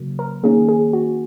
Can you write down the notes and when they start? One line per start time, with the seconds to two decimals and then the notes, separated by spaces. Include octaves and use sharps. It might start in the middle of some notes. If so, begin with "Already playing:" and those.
Already playing: C#3 F#3 A#3
0.19 A#4
0.43 D#3 A#3 C#4 G#4
0.69 G#4
0.93 F#4